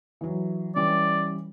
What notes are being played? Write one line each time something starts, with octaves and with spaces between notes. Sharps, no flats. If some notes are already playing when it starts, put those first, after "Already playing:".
E3 F#3
E3 G3 C#4 D5